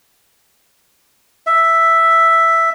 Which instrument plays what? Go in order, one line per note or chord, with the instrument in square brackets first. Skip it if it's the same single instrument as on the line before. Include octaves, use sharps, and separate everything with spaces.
[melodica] E5